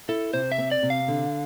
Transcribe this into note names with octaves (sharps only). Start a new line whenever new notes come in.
E4 A4
C3 C5
E5
C4
D5
C3
F5
D3